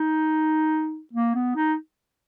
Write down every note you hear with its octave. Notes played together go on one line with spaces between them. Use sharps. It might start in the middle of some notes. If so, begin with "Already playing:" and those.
Already playing: D#4
A#3
B3
D#4